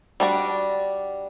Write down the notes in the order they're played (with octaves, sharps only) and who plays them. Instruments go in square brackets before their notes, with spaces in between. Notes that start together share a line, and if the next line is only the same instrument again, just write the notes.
[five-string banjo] G3 D4 F#4